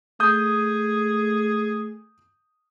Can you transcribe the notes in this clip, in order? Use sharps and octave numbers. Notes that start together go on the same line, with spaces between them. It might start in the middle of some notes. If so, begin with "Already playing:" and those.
A3 G#4 D#6 G6